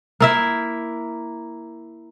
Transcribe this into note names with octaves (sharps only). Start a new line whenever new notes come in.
A#3 E4 E5